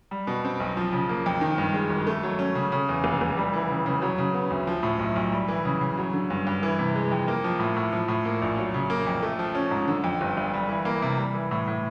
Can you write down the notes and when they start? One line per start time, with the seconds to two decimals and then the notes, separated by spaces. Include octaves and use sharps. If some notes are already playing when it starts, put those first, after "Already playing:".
0.11 G3
0.27 B2
0.44 C4
0.60 B1
0.77 F3
0.93 C#3
1.09 A#3
1.26 F2
1.41 D#3
1.58 G2
1.74 G#3
1.90 G#1
2.07 A3
2.23 F#3
2.39 C#4
2.55 C#3
2.72 C#3
2.89 E2
3.04 F1
3.21 F1
3.37 G3
3.53 E3
3.70 C#3
3.86 C#3
4.02 F#3
4.18 C#3
4.34 B3
4.50 D2
4.67 F3
4.83 A2
4.99 B1
5.16 B1
5.32 G3
5.48 E3
5.65 C#3
5.81 C#3
5.97 F#3
6.13 D3
6.30 G2
6.47 G2
6.63 E3
6.79 C3
6.96 G#3
7.11 F2
7.28 A#3
7.44 F3
7.59 A2
7.76 A2
7.92 F3
8.08 A2
8.25 A#3
8.42 A#1
8.58 F#3
8.74 C#3
8.90 A#3
9.07 F2
9.23 A3
9.39 F3
9.55 C#4
9.71 G#2
9.88 D3
10.04 F2
10.21 G1
10.37 G1
10.54 G3
10.69 E3
10.85 A#3
11.02 C3
11.17 G3
11.34 E3
11.51 A2
11.67 A2